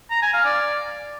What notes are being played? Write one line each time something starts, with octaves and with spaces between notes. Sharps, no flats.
A#5
G#5
F5
D5